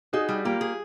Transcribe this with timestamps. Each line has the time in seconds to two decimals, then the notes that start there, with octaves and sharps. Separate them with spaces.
0.13 D#4 F#4 G#4
0.29 G3
0.45 A#3 F4 G4
0.61 G#4